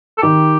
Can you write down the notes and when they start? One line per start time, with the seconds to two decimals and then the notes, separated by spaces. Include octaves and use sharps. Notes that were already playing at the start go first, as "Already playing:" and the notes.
0.18 A4
0.22 D#3 G4